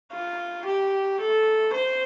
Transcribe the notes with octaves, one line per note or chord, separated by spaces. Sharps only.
F4
G4
A4
C5